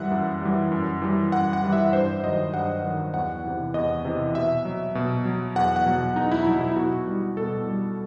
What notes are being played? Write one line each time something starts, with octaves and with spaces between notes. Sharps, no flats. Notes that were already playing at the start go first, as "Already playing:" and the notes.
Already playing: F#2 E3 G3 E5 F#5
F#2
E3 G3
F#2
E3 G3
F#2 F#5
F#5
E3 G3
E5
G2 C5
D#3 F#3 D#5
G2 F#5
D#3 F#3
E2 F#5
C3 E3
E2 D#5
C3 E3
B2 E5
F#3
B2
F#3
E2 F#5
F#5
B2 F#3
E2 D#4
E4
B2 F#3 E4
E4
B2 F#4
G3
B2 A4
G3